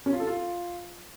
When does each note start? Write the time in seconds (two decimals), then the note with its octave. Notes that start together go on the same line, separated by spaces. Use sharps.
0.06 C#4
0.13 F4
0.20 A4
0.27 F4